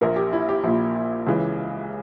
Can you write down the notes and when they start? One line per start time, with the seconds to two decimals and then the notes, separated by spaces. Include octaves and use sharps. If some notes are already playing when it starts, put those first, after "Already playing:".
0.01 A#1 A#2 A#4
0.16 G4
0.33 E4
0.49 G4
0.64 A#1 A#2
1.27 C#2 C#3 E3